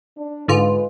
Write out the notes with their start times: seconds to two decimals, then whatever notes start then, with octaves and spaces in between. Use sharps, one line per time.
0.17 D4
0.48 G#2 D3 G#3 F4 B4